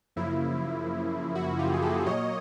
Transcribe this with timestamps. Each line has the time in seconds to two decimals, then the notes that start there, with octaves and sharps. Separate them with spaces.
0.16 F#2 C#3 F3 A#3 E4
1.35 E4 F#4
1.59 F4 G4
1.74 G#4
1.82 G4 A4
2.06 A#2 F#3 A#3 C#5 D#5